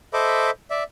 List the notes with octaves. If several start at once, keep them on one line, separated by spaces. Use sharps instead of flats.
A4 C5 D#5 E5 B5 D6
D5 E5